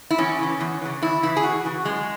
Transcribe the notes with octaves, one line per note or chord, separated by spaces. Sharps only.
E4
E2 C#4
C#3 E3
E2
C#3 E3
E2 E4
C#3 E3 E4
G#4
E2 F#4
C#3 E3
F#2 G#3